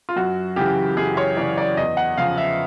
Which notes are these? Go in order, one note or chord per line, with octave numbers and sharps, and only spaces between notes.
F4
F#2 F#4
C#3 E3 G4
F#2 G#4
C#5
C#3 E3 D5
D5
E2 D#5
F#5
C#3 F3 F5
E5